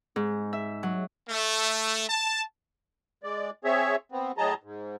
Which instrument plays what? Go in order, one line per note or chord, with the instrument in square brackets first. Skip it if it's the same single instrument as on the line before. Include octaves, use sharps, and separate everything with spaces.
[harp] G#2
E5
F#3
[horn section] A3
A5
[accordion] G#3 D5
C4 G#4 C#5 E5
B3 C4
A2 F#3 G#4 D#5 A5 A#5
G#2